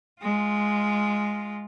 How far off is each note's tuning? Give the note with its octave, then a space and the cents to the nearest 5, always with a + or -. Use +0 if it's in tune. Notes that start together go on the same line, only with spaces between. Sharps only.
G#3 +0 F4 +0